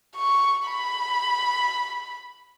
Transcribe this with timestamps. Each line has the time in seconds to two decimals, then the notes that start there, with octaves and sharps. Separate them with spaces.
0.17 C#6
0.66 B5